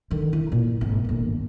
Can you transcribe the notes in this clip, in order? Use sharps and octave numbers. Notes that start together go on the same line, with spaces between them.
D3 D#3
E4
A#2
G#1
G1 D#2